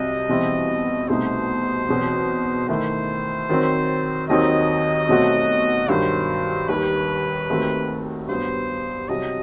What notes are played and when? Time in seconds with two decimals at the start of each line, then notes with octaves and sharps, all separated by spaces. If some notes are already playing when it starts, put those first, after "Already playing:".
Already playing: C2 C3 F#3 D#5
0.29 E2 B2 G3 C4 E4
1.09 C2 B2 A3 D#4 C5
1.89 E2 B2 F#3 C4
2.68 D#3 A3 E4 C5
3.49 D#3 F#3 C4
4.28 D#2 D#3 F#3 C4 D#4 D#5
5.09 B2 F#3 A3 C4 F#4
5.88 G2 D#3 F#3 C5
6.69 D#2 D#3 G3 B4
7.50 D#2 D#3 A3 C4 F#4
8.28 G2 F#3 B3 C5
9.09 C2 C3 F#3 D#5